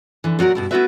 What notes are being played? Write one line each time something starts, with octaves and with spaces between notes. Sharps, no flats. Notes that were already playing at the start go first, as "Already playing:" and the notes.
D3 E3
A#2 F#3 F#4 A#4
G2 B2 E4
A3 B3 E4 F#4 B4 E5